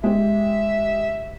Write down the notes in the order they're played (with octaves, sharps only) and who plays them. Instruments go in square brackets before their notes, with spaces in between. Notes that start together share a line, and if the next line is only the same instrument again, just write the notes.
[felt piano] G#3 G4 [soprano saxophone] E5